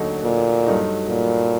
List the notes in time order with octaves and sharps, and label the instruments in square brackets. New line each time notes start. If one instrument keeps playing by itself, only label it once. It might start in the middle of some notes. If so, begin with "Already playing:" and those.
Already playing: [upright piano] D#2 D3 F#3 A3 D#4
[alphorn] A#2
[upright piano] G2 F#3 A3 D#4 F#4
[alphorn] A#2